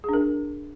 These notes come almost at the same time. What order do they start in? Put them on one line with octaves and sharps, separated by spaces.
G#4 D4 A#4